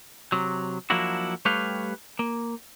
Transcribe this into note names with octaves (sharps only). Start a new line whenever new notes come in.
C3 F#3
F3 F#3 A#3 D4 E4 F#4
G3 A3 G4 B4 C#5 F5
A#3